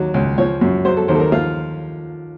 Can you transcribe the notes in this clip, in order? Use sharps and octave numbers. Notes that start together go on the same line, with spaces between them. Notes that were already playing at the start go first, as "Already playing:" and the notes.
Already playing: D#2 F#3
C#2
F3 C#5
F#2
F#3 C5
A4
D#2 C5
A4
A#4
F3 F4